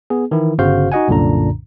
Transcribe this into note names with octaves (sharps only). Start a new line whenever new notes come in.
B3 G#4
D#3 E3 E4
G1 C#3 F#4 C5 F5 G6
D#4 F#4 D#5 F#5 G#5
C2 F#2 A#2 D3 D4 A#5